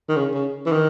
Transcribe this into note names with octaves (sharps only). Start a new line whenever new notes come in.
D#3
C#3
C#3
E3
D#3